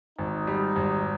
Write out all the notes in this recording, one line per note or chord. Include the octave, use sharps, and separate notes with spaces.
G#1 D#4
G3
G#1